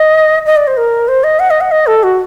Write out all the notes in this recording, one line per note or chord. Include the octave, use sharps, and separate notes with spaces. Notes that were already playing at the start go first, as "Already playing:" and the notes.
Already playing: D#5
D#5
D5
C5
A#4
C5
D#5
F#5
D#5
F#5
D#5
A4
F#4